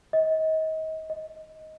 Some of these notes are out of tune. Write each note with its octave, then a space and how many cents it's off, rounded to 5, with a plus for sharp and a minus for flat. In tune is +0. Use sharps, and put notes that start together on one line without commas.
D#5 +30
D#5 +10